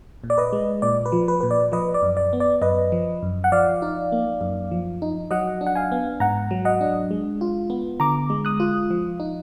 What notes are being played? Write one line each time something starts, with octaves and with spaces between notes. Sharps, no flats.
A#2
D5
B4 D#5
G#3
A#2 D5
B4
F3
B4
A#2 B4
D5
F3 B4 D#5
D5
F#2
D5
B3
D5
F#2 B4 D#5
F3
F#2
F#5
F3 D5 F5
D#4
A#3
F#2
F3
D#4
F#3 D#5 F#5
D4
F#5
F5 G#5
B3
G#2 F#5 A#5
F#3
D#5 F#5
D4
G#3
F4
B3
D3 A#5 D6
G#3
D#6 F#6
F4
F3
D#4